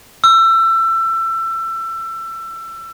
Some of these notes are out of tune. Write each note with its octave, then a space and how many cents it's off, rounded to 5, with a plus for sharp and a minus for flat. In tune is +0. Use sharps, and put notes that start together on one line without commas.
E6 +25